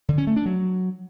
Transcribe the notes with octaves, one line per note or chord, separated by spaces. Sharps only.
D3
C#4
A3
D4
F#3